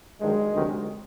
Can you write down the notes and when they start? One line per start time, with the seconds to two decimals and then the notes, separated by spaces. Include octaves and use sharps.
0.21 G2 D#3 F#3 G#3
0.54 D2 C3 D#3 F#3